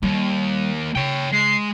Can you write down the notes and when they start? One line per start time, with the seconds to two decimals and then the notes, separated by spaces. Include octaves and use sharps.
0.03 D#2 G3
0.95 C#3 C#5 G5
1.33 G#3 C7